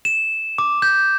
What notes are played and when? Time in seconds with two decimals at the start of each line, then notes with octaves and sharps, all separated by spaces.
0.05 E7
0.58 D6
0.82 G6